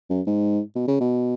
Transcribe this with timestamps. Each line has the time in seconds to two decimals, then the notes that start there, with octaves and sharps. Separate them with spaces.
0.10 F#2
0.27 G#2
0.75 B2
0.88 C#3
1.00 B2